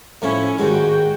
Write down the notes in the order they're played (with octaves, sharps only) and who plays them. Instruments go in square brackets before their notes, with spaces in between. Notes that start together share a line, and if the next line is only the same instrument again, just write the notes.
[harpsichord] A2 F3 A3 [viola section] C#4 E4
[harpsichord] D#2 G#2 G#3 [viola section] F#4 G5